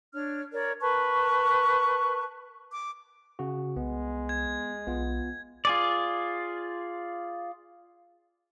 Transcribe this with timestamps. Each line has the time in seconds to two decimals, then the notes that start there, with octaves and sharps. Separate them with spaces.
0.14 D4 C#5 F6
0.53 A#4 C#5 D5
0.82 A#4 B4 A5 C#6
2.72 D6
3.39 C#3 F#4
3.76 C2 G#3 B3
4.29 G#6
4.87 B1 B3 F4
5.65 F4 G#4 D5